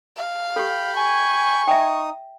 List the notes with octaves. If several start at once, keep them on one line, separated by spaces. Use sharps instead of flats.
F5
G4 A4 G5 B5
G#5 C#6
D#4 E5 G5 D#6